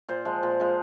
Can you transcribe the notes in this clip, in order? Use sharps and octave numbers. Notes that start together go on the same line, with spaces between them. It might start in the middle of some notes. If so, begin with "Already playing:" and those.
A#2 C5
F3 G#3
A#2
F3 G#3